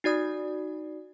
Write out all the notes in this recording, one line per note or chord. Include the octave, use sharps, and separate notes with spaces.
D#4 F#4 D5 D#6